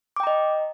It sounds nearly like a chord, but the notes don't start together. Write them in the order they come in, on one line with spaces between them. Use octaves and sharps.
D6 G5 A#5 D#5